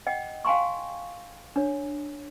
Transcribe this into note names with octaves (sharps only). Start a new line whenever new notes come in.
D#5 F#5 G5
F5 G5 G#5 A#5 C6 C#6
D4 C#5